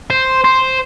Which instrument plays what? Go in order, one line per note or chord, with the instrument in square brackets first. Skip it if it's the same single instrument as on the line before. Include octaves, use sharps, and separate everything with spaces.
[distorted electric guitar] C5
C5